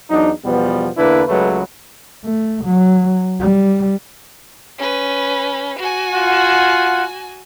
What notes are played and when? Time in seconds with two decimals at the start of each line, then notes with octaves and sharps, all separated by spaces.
0.10 E2 F#3 D4 D#4
0.44 E2 B2 F3 G3 B3
0.97 E2 D3 A#3 D4 E4 B4
1.28 C#2 F#3 G#3 A3 B4
2.24 A3
2.65 F#3
3.40 G3
4.78 C#4 B4
5.78 F#4 G#5
6.13 F4 F#5